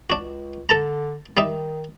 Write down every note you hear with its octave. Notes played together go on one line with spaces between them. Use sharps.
C#2 D4 F#4
D3 A4 A5 A#5
D#3 G3 D#4 E5